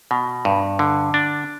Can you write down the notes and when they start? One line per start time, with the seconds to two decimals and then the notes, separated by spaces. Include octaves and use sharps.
0.11 B2
0.45 G2
0.79 D3
1.14 D4